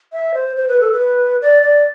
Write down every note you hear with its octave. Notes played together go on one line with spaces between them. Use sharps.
E5
C5
C5
B4
A4
B4
D5
D5